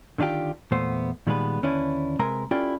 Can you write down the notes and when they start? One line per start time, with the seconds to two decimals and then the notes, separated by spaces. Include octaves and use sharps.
0.18 D3 D#3 D4 F4 G4
0.72 E2 A#2 A3 B3 C5
1.27 A#2 D#3 G3 G#3 B3 B4
1.62 D#2 D3 C#4 D4 E4 B4
2.19 C3 G#3 C4 A#4 B4 A#5
2.51 C#4 E4 F4 G4 A4 D5